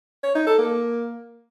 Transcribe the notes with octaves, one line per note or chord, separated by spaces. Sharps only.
C#5
D#4
A4
A#3